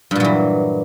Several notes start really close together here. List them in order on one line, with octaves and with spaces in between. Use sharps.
G2 A#2 F#3 E3